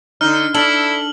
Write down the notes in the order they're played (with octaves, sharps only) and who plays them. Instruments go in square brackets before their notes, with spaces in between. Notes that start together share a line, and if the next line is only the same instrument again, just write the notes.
[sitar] D3 D#4 [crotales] F6
[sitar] D4 [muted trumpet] E4 [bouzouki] A4 [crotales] F6 F#7